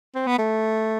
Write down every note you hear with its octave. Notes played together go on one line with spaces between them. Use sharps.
C4
B3
A3